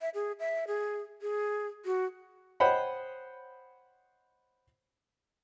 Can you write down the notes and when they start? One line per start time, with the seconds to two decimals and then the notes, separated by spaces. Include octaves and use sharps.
0.01 E5
0.14 G#4
0.40 E5
0.68 G#4
1.22 G#4
1.85 F#4
2.60 C5 C#5 D#5 F#5 G5 B5